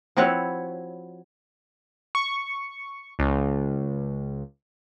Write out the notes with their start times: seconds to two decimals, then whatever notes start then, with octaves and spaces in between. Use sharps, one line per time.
0.17 F3 C4 E4 F#4 B4 C#5
2.15 C#6
3.19 C#2